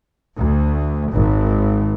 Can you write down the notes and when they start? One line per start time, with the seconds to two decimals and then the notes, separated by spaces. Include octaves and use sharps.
0.36 D2
1.12 G#1